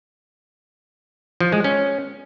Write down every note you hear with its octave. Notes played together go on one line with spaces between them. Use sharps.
F3
G#3
C#4